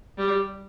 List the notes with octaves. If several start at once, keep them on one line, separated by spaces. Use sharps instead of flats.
G3